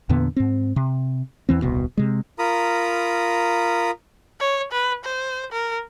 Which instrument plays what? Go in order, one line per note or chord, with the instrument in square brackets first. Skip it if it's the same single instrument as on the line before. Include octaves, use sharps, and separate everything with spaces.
[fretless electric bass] E2 A#2 D3 B3
G#2 C4
C3
E2 E3 C4
D#1 C2 B2
C3 G#3
[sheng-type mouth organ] F4 A#4 A#5 B5 D#6
[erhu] C#5
B4
C5
A#4